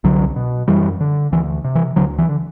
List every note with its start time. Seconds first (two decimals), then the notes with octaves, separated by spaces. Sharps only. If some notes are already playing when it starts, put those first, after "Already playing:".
0.04 C2 D3 F#3
0.36 B2
0.68 F#2 E3 G3
1.01 D3
1.32 D2 E3
1.65 C3
1.75 E3
1.96 D2 D3 F#3
2.18 E3
2.29 D3